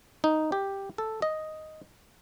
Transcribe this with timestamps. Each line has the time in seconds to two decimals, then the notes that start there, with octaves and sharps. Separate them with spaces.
0.24 D#4
0.52 G4
0.98 A4
1.22 D#5